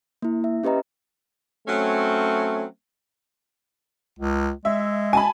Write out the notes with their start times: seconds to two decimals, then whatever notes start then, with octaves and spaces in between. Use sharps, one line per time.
0.22 A#3 E4
0.44 E5
0.63 C#4 G4 B4 D#5 A#5
1.68 F#3 A3 C4 C#4
4.19 C#2
4.65 G#3 E5
5.13 G#5 A5 B5